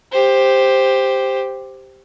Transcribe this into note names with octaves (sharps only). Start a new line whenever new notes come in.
G4 C5